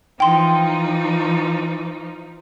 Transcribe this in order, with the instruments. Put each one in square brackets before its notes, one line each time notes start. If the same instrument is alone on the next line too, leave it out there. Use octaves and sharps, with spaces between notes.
[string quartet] E3 F3 D#4 [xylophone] G5 C6